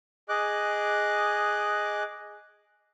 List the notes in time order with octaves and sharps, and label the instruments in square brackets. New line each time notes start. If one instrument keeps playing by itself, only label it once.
[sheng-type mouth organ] G#4 D#5 D6 F#6